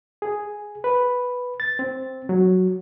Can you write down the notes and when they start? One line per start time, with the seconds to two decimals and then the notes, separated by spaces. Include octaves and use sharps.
0.22 G#4
0.84 B4
1.60 A6
1.79 C4
2.29 F#3